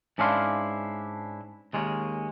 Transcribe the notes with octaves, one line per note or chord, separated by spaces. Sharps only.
G#2 C#4 D4 E4 F5 C6
D#2 G#3 A#3 C#4